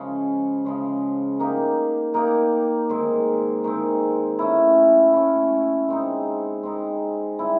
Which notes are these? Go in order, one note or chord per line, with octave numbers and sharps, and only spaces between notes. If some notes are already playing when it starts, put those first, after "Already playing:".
Already playing: C#3 F3 G#3 C#4
C#3 F3 G#3 C#4
A#3 D#4 G4
A#3 D#4 G4
D#3 G#3 C4
D#3 G#3 C4
A3 C#4 E4
A3 C#4 E4
G#3 C4 D#4
G#3 C4 D#4
G3 C4 E4